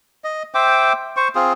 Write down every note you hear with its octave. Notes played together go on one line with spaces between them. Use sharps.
D#5
C5 E5 G5 D6
C5 C#6
C4 F4 G#4